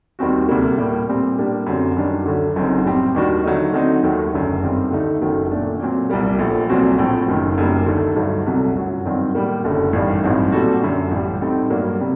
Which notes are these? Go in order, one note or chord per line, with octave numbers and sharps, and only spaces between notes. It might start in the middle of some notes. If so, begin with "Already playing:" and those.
D#2 D#3 G3 C4 F#4
D2 C3 G3 A#3
A2 G3 A#3
A#2 G3 C4
A2 G3 A#3 D4 G4
F#2 D3 F#3 C4
F#2 D#3 G3 D4
D2 D3 F#3
F#1 F#2 F#3 C4 D#4
A2 G3 C4 G4
D#2 D#3 G3 D4 F#4
D3 F#3 A3 D#4
D3 F#3 C4 D#4
D#2 D#3 F#3 A3
F#1 F#2 D3 A3
G2 D#3 G3 C4
D2 D3 A3 D#4
F#1 F#2 D#3 F#3 A3
A#2 A3 D4
A#2 F#3 C4
C2 A#2 G3 A#3
A#1 A#2 A3
C2 A#2 F#3 C4 F#4
A#1 A2 A3 C4
F#1 F#2 D#3
F#1 F#2 D#3 G3 A#3
D2 D3 A3 D#4 A4
G2 D3 F#3 A3 D#4
C2 C3 F#3 A3
G1 F#2 F#3
G2 D#3 F#3 C4
A2 G3 A#3
F#1 F#2 D3 A3
A1 G2 D#3 G3
A1 G2 F#3 C4 D#4
A#2 G3 C4 F#4 A4
F#2 D3 A3
A1 A2 G3
A2 G3 C4 D#4 A4
G2 F#3 A#3
C3 G3